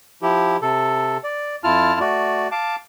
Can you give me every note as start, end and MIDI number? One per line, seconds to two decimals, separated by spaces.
0.22 0.57 53
0.22 0.57 64
0.22 0.57 67
0.62 1.17 48
0.62 1.17 69
1.24 1.56 74
1.64 1.99 41
1.64 1.99 64
1.64 1.99 65
1.64 1.99 81
1.64 1.99 89
2.00 2.48 57
2.00 2.48 66
2.00 2.48 74
2.52 2.76 77
2.52 2.76 81
2.52 2.76 86